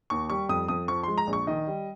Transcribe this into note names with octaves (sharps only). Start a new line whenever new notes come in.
D#2 C#6
G3 C#6
F2 D#6
F2 D#6
F3 C#6
G#3 C6
A#5
A#1
C#6
D#3 D#5
G3